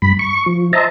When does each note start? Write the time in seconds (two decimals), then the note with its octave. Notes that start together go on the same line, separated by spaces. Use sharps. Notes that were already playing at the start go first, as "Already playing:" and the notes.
0.02 G2 B5
0.19 C#6
0.46 F3
0.73 C5 D#5 E5 A5 A#5